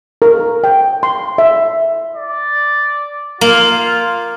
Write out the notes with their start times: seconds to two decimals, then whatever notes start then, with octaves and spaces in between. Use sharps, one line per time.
0.22 A#4
0.64 G5
1.03 C6
1.38 E5
2.15 D5
3.41 A#3 F4